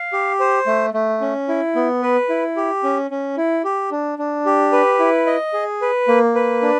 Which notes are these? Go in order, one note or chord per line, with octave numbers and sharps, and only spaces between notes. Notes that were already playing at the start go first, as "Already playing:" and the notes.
Already playing: F5
G4
C5
A3
A3
C#4
E4
B3
B4
E4
G4
C#4
C#4
E4
G4
D4
D4
G4
B4
E4
D#5
G#4
B4
A#3
B4
D4